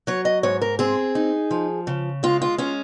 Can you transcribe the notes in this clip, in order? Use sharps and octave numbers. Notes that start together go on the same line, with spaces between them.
F#3 C#5
D#5
G#2 C#5
A#4
C4 G#4
D#4
F3
C#3
G#3 F4
F4
C#4 F4